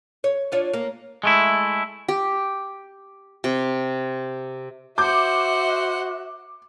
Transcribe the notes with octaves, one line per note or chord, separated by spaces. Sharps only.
C#5
D4 F4 C#5
A#3
G#3 A3 E4
G4
C3
F#4 C5 E5 F#5 D6 G6